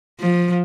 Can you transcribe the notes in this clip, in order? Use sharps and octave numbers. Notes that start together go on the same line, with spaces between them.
F3